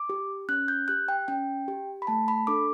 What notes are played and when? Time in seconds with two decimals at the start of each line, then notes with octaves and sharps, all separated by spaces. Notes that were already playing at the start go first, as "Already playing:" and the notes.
Already playing: D6
0.09 G4
0.49 C#4 F#6
0.68 G6
0.88 G4 F#6
1.08 G5
1.28 C#4 G5
1.68 G4
2.02 B5
2.07 A3 A5
2.28 B5
2.47 D4 A4 D6